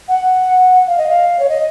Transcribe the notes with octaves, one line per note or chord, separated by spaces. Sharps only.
F#5
F5
D#5
F5
C#5
D#5